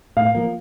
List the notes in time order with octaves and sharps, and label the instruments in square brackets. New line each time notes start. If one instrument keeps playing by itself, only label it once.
[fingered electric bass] A2 [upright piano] F5
[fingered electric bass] F3 A#3